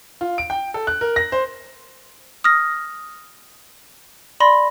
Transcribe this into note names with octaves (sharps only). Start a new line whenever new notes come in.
F4
D7
G5
A4
F#6
A#4
A#6
C5
D#6 F6 A#6
D5 B5 C6 A#6